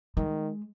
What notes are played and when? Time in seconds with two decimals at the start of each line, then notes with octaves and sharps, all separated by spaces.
0.17 D#3 G#3